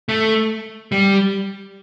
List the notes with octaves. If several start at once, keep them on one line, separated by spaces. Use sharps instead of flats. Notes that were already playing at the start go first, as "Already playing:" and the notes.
A3
G3